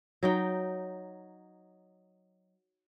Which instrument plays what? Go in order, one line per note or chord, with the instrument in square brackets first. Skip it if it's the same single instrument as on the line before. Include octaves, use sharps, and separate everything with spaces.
[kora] F#3 D#4 G5